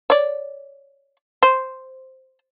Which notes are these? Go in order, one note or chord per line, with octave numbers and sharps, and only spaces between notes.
C#5 D5
C5